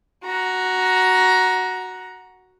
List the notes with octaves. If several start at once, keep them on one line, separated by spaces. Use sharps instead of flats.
F#4 A#5